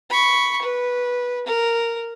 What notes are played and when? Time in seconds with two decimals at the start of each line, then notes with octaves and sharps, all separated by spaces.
0.10 B5 C#6
0.62 B4
1.47 A#4